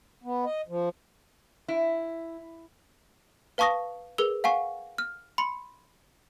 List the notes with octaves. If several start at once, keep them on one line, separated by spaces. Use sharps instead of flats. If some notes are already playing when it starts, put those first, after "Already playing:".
B3
D#5
F3
E4
B4 F5 A5 C#6 D#6 A#6
G#4 A#4 B4 E6 G7
F5 F#5 G#5 C#6
F6
B5 C6 C#7